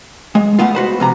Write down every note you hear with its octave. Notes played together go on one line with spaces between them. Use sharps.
G#3
G#3 A3 B3 F4
F#4 B4 C5
F2 C3 A#5